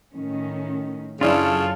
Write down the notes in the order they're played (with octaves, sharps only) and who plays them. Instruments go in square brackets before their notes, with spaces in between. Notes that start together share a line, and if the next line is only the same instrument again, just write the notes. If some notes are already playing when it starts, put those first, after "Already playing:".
[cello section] A2 D#3 C#4
[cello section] F#2 F#3 F5 [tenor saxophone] C#3 [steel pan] D4 E4 [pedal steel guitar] F4 A4